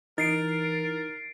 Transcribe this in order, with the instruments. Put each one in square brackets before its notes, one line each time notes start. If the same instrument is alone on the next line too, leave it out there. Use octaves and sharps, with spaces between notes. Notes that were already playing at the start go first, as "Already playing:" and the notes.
[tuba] E3 [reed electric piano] D#4 [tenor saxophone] A#4 [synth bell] A6 C7 D7